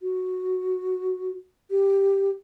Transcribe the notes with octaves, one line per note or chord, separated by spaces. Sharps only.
F#4
G4